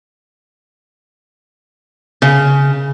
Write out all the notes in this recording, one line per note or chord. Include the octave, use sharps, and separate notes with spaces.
C#3